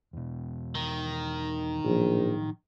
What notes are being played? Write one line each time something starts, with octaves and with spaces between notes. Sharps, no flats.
E2 B2
D#3
A#1 A2 F3 F#3